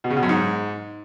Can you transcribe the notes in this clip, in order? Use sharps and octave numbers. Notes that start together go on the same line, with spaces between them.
B2
C#3
B2
F#2
G#2